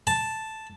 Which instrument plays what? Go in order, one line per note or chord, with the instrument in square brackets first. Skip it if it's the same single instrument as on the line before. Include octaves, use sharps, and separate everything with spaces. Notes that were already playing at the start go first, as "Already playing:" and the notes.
[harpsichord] A5